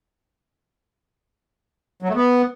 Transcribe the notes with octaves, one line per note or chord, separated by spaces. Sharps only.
F#3
A3
B3